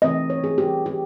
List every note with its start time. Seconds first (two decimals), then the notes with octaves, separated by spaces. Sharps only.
0.02 C3 E3 A3 C4 D#5
0.30 C#5
0.44 G#4
0.58 G4
0.86 G4